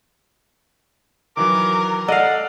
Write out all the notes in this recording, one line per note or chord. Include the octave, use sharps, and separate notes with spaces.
D#3 E3 F#3 A#4 D6
A4 D5 D#5 F5 F#5 E6